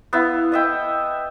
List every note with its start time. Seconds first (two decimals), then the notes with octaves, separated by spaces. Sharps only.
0.13 B3 E4 F5
0.52 D#5 E5 G5